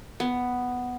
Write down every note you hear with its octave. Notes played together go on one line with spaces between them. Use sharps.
B3